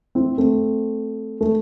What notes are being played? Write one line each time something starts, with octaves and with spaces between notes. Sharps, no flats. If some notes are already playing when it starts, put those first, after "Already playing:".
C4 E4
A3 C4
A3